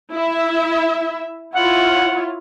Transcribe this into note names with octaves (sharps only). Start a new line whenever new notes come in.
E4 E5
E4 F4 C#5 F#5